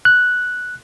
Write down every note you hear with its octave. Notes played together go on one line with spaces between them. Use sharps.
F#6